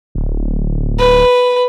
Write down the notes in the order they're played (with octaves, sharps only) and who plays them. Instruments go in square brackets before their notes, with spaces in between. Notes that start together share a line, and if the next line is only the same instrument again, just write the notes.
[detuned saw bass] D1
[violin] B4